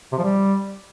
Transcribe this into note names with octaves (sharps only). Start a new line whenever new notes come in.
C3
F3
G3